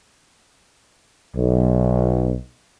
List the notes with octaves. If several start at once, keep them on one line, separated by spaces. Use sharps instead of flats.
B1